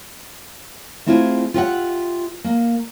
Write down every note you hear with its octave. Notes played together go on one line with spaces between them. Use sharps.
A3 C4 E4 F4 G4 G#4
F4 G4 B4 D#5 E5 F#5
A#3